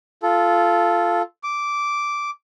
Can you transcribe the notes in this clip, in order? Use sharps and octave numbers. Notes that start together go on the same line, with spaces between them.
F4 A4
D6